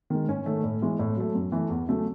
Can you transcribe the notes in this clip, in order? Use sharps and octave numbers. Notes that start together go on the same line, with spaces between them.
D#3 G#3
G#2 C#4
D#3 A3
A2
E3 G#3
A2
F#3 A3
F#2
E3 A3
E2
C#3 F#3 A3